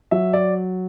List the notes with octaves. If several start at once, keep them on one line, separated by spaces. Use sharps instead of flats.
F#3 E5
D5